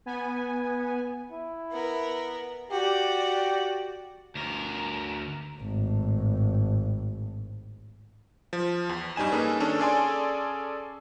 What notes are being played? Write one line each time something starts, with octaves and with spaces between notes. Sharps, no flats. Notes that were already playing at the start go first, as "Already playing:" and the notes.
B3 G#5
E4
B3 A#4
F#4 G4 D5
D2 A#4
G#1 A2
F3
E2
G2 G3 D#4 G#5 E7
A#3 C#4 D#4 G#4 A4 B4
D#3 C#4 D4 A4
C#4 G#4 A4 D5 G#5 C6